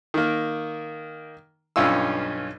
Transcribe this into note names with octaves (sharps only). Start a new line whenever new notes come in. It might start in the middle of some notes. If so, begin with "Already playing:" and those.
D#3 A#3
B1 G2 C#4 F4 E6